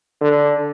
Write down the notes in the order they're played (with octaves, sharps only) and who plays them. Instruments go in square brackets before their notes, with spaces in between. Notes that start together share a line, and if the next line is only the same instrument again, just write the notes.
[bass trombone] D3